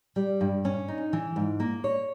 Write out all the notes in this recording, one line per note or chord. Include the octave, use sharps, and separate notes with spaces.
G3
G2
C#4
D#4
E3
G#2
A#3
C#5